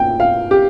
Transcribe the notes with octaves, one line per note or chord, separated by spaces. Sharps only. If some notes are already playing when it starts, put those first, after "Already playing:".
Already playing: A#2 G5
F5
G4